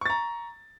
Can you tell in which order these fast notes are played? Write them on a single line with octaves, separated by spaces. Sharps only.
C#6 A6 A#5